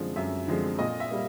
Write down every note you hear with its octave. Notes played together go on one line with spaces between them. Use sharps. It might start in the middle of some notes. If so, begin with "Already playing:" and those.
Already playing: F#2 D3 F3 G#3 C4
F#2 E5
D3 F3 G#3 C4
A#2 D#5
E5
G3 A#3